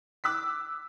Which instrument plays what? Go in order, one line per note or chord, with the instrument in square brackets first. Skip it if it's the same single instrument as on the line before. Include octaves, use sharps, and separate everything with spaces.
[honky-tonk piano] D6 E6 F#6 B6